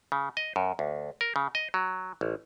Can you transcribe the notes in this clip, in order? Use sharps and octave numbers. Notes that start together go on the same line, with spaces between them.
C#3
D#5
F#2
D2
A#4
C#3
D#5
F#3
A1